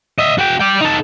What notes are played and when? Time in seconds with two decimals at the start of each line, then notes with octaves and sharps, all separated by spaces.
0.18 D#5 E5
0.38 F#4 G5
0.60 D5 G5
0.81 D#4 A4